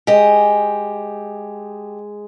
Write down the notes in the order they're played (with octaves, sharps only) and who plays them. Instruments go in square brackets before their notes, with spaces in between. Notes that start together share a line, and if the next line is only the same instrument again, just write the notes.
[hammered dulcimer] G#3 [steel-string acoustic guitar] G4 D#5